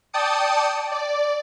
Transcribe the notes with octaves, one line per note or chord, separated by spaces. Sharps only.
D5 G5 A5 D#6 C#7
D5